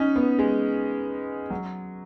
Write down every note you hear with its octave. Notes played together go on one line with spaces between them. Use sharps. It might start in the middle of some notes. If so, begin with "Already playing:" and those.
Already playing: C#4 D#4
B3
G#3
F#3